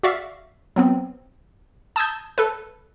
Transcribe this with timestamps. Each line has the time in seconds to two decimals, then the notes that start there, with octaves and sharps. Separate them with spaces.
0.03 F#4 D5 E5 F5
0.76 F#3 B3 C4
1.96 A5 D#6 E6 G6 G#6
2.38 A4 B4